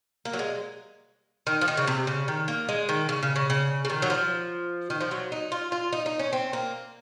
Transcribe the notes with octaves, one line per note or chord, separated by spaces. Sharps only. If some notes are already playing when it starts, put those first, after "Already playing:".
A#3
F#3
G#3
D#3
F3
D#3
C#3
C3
C#3
D#3
A#3
G#3
D#3
C#3
C#3
C#3
C#3
C#3
D#3
F#3
F3
D#3
F3
F#3
D#4
F4
F4
D#4
D#4
C#4
C4
A#3